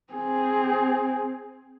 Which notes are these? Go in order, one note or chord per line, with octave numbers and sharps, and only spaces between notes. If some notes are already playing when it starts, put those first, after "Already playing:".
C4 G#4